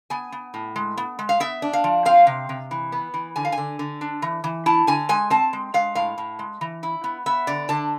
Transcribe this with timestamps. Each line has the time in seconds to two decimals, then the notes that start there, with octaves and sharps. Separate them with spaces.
0.10 B3 G#5
0.32 B3
0.54 A2
0.76 G#3
0.97 B3
1.19 G#3
1.29 F5
1.40 B3 E5
1.62 D4
1.73 F5
1.84 F3
2.05 C4 F5
2.27 C3
2.49 C3
2.71 E3
2.92 B3
3.14 E3
3.36 D3 G#5
3.45 F5
3.52 G#5
3.58 D3
3.79 D3
4.01 D4
4.22 E3
4.44 E3
4.66 E4 A5
4.87 D3 G#5
5.09 G#3 G#5
5.30 C4 A5
5.53 G#3
5.74 G#3 F5
5.95 A2 F5
6.18 A2
6.39 G#3
6.61 E3
6.83 E4
7.04 B3
7.26 B3 E5
7.47 D3 D5
7.69 D3 A5